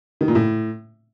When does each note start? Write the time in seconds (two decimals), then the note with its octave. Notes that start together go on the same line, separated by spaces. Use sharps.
0.21 D#3
0.28 A#2
0.35 A2